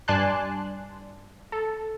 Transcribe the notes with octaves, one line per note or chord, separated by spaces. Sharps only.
G2 D5 G#5 A5 C6 F#6
A4